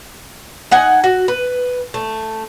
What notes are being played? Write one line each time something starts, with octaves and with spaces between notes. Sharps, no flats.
D#4 F#5 G#5
F#4
B4
A3